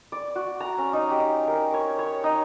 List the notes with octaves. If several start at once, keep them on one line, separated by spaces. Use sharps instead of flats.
D5
F#4
A#5
C#4
D#4
G4
A#4
C#5
C#5
D#4